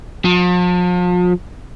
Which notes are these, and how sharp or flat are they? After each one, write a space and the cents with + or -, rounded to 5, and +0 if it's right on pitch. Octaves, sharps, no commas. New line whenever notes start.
F3 +40